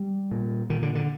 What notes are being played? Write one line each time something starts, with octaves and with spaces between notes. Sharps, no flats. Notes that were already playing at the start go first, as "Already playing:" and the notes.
Already playing: G3
A#2
A#2 D#3
D3
D3